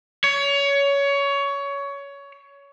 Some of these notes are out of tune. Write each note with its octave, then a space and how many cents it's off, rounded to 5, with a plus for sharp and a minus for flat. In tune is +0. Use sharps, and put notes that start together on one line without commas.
C#5 +20